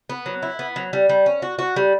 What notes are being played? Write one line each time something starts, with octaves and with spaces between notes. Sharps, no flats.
B3
F#3
E4
B3
F#3
G3
G3
C#4
F#4
F#4
G3